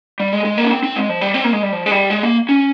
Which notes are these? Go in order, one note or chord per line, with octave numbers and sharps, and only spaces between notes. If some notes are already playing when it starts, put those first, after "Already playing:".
G3
G#3
G#3
A#3
C#4
C4
C4
G#3
F3
G3
C4
A#3
G#3
G3
F3
G#3
G3
G#3
A#3
C#4